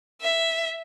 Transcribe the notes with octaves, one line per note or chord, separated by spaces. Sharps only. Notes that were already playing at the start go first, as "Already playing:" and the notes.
E5